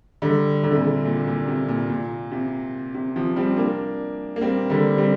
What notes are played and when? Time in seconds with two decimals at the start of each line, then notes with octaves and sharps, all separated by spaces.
0.22 D3 G3
0.63 D3
0.71 C3
0.78 A#2 D3
1.05 A#2
1.27 A#2
1.48 C3
1.68 A#2
1.89 A#2
2.31 C3
2.95 C3
3.16 C3 F3
3.36 G3 C4
3.57 A#3 D4
4.36 A#3
4.41 G3 C4
4.69 D3 G3
4.97 G3 C4